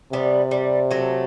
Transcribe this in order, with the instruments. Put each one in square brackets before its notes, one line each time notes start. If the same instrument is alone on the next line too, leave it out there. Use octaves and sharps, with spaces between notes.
[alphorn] C3 [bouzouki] G3 B3
[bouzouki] G3
F#3 A3